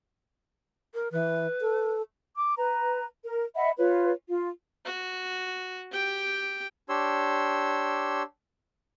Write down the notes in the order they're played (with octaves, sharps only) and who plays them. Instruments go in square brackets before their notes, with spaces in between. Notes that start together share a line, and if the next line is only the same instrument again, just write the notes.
[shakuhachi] A#4
[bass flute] E3 [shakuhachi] B4
[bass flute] A4
[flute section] D6
B4 A#5
A#4
D#5 E5 F#5 B5
F4 B4 C#5
F4
[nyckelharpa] F#4
G4 G5
[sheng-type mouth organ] D4 G4 C#5 C6 E6